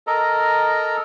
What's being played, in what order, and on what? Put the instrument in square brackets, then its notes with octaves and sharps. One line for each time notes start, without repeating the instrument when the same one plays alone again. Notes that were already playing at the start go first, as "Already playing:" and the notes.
[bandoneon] A4 A#4 D#5 A#5